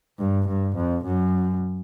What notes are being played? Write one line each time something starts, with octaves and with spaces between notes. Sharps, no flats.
G2
G2
F2
F#2